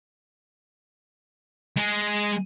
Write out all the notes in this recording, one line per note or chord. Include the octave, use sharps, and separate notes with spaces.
G#3 G#4